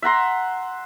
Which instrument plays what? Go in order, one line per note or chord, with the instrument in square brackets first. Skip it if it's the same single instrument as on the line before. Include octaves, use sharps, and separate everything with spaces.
[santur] E5 F#5 A#5 C6